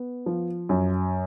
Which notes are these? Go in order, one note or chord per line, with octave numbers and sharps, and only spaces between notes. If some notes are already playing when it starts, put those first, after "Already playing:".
Already playing: B3
F3
F#2